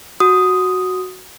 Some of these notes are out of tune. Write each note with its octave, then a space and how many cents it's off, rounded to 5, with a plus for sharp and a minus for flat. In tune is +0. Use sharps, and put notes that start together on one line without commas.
F#4 +0 D#6 +0